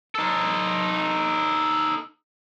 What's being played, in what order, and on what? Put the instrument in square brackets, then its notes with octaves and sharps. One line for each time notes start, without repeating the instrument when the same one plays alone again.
[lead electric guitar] D#4 A4